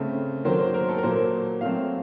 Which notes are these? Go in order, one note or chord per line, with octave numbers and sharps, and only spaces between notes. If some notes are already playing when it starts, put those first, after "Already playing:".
Already playing: C#3 A3 C4
D#3 F#3 A#3 C5
C5
A#4
A4
A#4
A#2 F#3 A#3 C5
A#2 F#3 A3 C4 F5